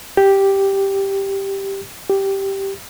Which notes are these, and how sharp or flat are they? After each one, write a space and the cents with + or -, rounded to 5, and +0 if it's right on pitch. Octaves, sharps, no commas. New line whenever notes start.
G4 +0
G4 -5